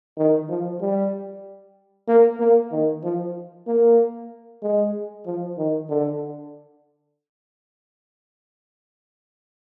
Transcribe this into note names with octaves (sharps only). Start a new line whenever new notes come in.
D#3
F3
G3
A#3
A#3
D#3
F3
A#3
G#3
F3
D#3
D3